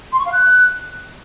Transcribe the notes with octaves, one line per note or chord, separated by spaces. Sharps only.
C6
C#6
F5
F#6